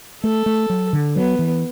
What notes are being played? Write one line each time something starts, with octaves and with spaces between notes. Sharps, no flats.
A3 A4
A3
F#3
D3
F#3 B3
E3